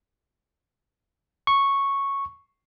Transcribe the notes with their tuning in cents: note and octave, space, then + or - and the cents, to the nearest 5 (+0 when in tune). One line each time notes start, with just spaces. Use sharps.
C#6 -5